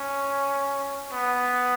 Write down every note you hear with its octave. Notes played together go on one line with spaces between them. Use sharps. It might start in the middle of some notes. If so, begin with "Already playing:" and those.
Already playing: C#4
B3